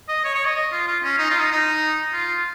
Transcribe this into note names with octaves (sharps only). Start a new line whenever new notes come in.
D#5
C#5
C#5
D#5
D#5
F4
F4
C#4
D#4
F4
D#4
D#4
F4